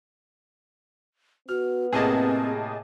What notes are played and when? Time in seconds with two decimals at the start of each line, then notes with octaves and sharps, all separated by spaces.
1.49 B3 F#4 F6
1.92 A2 C3 A#3 C4 G#4 D#5 A5